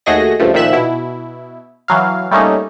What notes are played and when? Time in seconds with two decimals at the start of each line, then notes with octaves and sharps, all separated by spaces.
0.06 D#2 A3 F#4 G#4 D#5 A#6
0.39 C#2 G2 F3 A3
0.54 A#2 D#3 F3 E5 F#6 E7
0.72 B2 E4
1.88 E3 F#3 F5
2.31 G3 A3 A#3 C#4 D#4